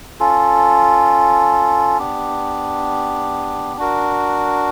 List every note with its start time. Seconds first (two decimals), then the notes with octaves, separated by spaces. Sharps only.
0.20 C#4 F4 A4
1.99 B3 D4 G4
3.77 D4 F#4 A#4